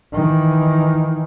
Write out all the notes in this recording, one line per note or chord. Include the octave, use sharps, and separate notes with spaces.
D#3 E3